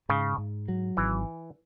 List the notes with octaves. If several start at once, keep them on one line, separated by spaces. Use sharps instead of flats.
G#2 C#3
G#2
F#3
G#1 E3